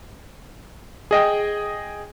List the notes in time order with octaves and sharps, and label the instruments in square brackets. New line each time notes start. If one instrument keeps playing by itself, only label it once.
[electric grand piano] G#4 D#5 G5